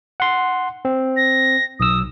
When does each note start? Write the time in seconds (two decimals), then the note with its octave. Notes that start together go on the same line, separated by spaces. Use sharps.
0.20 F#5 C6
0.85 C4
1.17 A#6
1.80 B1 D#6 E6